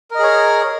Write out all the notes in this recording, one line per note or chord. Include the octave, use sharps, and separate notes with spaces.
G#4 A#4 C#5 D#5